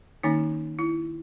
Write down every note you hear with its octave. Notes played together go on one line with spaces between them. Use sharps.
D#3 A#3 C#4 D#4
E4